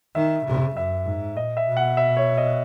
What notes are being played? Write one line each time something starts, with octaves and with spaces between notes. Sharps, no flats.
D#3 E5
C#3
F#2 E5
G#2
A#2 D#5
E5
B2
F#5
E5
C#5
D#5